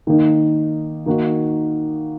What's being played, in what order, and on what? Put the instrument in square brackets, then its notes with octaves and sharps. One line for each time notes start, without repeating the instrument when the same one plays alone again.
[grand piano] D#3 A#3 D#4
D#3 A#3 D#4 F#4